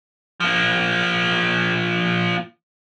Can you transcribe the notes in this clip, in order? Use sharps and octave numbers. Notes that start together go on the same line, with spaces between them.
F3 A#3